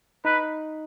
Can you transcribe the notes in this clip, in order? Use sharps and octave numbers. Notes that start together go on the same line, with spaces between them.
D#4 B4